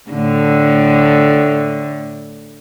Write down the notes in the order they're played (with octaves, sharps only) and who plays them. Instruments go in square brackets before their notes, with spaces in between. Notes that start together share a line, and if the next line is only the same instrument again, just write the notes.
[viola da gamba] A2 D3